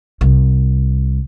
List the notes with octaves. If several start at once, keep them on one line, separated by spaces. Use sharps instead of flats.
C2